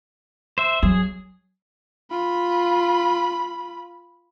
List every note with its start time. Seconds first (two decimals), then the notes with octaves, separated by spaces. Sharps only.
0.58 C5 E5
0.83 F#3 G#4
2.10 F4 B5